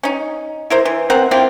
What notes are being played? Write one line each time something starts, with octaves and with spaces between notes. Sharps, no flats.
C#4 D#4
E4 A#4 C5
E3
C4 A#4 C5 F#5
A#3 C4 E4 F4